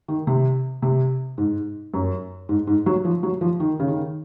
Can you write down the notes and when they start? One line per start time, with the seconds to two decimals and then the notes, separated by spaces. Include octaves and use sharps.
0.08 D#3
0.27 C3
0.82 C3
1.38 G#2
1.94 F#2
2.49 G#2
2.67 G#2
2.86 F#3
3.05 F3
3.23 F#3
3.41 F3
3.60 D#3
3.80 C#3
3.88 D#3